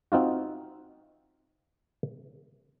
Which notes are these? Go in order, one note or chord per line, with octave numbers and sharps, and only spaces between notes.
C4 D#4 F4 F#4